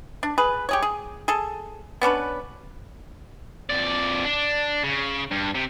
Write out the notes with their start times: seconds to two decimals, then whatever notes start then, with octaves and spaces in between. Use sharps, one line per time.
0.23 D4
0.38 G#4 B4
0.69 G4 G#4 C#5
0.82 G#4
1.28 G#4 A4
2.02 B3 C#4 D4 B4
3.70 F2 D5
4.25 D4
4.83 C#3
5.31 G2
5.55 C3